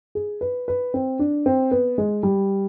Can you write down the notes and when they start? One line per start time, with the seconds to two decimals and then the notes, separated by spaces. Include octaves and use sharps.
0.15 G#4
0.41 B4
0.68 B4
0.94 C4
1.19 D4
1.46 C4
1.71 B3
1.98 G#3
2.23 G3